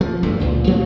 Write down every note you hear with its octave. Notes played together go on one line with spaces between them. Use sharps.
F3
D1 G2 G#3 A3
C#2 A#2
F3 A3 C4